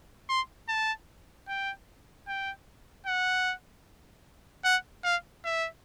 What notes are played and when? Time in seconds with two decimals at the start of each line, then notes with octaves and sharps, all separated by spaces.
0.29 C6
0.68 A5
1.48 G5
2.27 G5
3.06 F#5
4.64 F#5
5.04 F5
5.44 E5